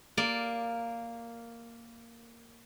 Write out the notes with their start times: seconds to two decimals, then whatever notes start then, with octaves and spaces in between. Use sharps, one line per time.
0.17 A#3 D5